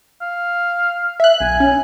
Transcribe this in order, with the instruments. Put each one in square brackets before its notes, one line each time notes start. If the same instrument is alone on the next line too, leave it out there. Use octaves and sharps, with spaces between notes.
[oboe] F5
[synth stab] E5 F#6
[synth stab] B1 [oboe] G#5
[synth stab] C#4